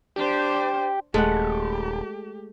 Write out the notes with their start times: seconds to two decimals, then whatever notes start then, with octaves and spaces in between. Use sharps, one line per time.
0.16 D4 G4 C5
1.14 D#1 G#3 A3 G4 F#5